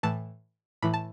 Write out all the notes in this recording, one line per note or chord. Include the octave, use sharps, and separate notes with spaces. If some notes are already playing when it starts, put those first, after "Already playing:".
A2 E3 A5
A2 E3 B5
A5